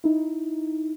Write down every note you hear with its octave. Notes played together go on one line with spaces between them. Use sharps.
D#4 E4